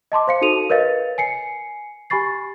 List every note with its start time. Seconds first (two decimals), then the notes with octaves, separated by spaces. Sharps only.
0.12 D#5 A5 C6 D6
0.27 C5 F5 C#7
0.41 D#4 F#4 A4 D#7 F7
0.70 A#4 B4 C#5 D#5 F5 A6
1.18 G#5 C7 C#7
2.10 G4 G#5 B5 C#6 A6 C7